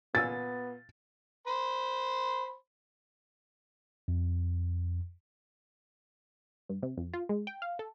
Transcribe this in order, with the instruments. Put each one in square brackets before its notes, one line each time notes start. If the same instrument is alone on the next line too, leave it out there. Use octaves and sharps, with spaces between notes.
[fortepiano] A#2 G#5 E6 [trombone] B3 [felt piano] A6
[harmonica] C5 B5 C6
[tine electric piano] F2
[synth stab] G2
C3
F2
F4
G#3
G5
F5
A4